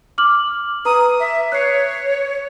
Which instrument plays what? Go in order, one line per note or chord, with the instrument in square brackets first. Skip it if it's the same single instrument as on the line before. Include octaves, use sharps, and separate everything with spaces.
[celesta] D6 F6 F#7
[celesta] B4 A#5 [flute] D#6
[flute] E5
[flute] C#5 [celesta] F#6 C7